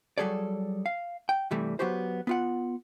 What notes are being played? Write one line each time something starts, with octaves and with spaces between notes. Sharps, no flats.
F#3 G3 G#4 A4 C#5 D5
F5
G5
G2 C3 E3 G3 A3
F#3 B3 C#4 F#4 G4 C5
B3 F4 F#5